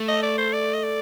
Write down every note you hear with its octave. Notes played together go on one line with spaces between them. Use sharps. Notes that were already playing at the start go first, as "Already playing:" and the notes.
Already playing: A3
D#5
D5
C5
D5
D#5
D5